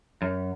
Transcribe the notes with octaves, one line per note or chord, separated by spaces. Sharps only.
F#2